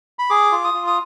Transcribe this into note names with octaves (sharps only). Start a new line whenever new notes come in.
B5
G#4 D6
F4
D#6
F4
D#6